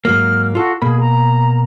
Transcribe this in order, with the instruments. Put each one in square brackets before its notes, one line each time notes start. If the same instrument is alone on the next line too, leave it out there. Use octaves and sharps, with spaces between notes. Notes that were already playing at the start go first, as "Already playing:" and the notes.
[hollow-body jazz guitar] G#2 F#3 A#3 [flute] F6
[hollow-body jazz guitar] F4 A4 [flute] F#4
[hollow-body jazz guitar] B2 A#3 B5 [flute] G#4
[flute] A#5